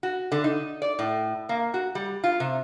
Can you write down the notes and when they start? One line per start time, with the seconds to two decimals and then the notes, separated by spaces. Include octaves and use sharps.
0.03 F#4
0.32 D3
0.44 D#4
0.82 D5
0.99 A2
1.49 A#3
1.74 F#4
1.95 G3
2.24 F4
2.40 C3